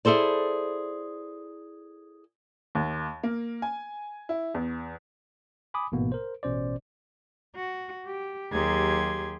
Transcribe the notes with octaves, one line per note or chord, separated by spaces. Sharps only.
E4 G#4 A4 C5 D5
D#2
A#3
G#5
E4
E2
G#5 B5 D6 D#6
A1 G#2 B2 A#3 B3
A#4 C5
A1 B2 C#4 C5 D5
F#4
G4
D#2 F#3 G4 G#4 C6 G#6